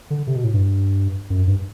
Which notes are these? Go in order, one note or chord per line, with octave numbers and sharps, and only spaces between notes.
D3
C3
B2
A2
G2
F#2
G2